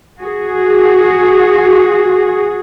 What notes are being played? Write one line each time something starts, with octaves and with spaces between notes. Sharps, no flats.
F#4 G#4